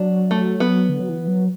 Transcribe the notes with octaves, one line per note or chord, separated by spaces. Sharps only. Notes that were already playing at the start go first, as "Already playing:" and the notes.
Already playing: F#3 D4
A3
B3
D3
F#3
E3
F#3